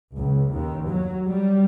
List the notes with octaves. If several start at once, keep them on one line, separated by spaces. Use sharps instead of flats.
C#2
D#2
F#3
G3